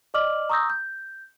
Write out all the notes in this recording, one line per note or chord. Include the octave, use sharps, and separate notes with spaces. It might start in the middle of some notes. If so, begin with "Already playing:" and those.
D5 D#5 D6 F6 F#7
A#5 C#6 D#6 E6 G6 A#6
G6